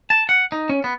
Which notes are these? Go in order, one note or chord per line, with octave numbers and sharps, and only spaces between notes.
A5
F#5
D#4
C#4
B3